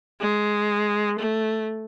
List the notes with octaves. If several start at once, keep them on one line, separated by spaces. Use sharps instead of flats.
G#3
A3